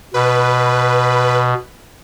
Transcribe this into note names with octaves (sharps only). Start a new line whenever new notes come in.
B2 B4